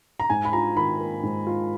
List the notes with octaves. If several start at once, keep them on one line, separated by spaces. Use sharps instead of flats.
A#5
G#2 G#5
B5
F4 A#5
D#3 B5
A#3
G#2
F4